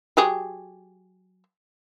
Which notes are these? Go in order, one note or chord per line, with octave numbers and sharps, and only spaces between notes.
F#3 G4 G#4